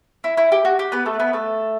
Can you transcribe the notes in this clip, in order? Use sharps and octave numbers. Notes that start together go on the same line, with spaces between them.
E4
E4
G4
F#4
G4
B3 B4
A3 A4
B3 B4
A3 A4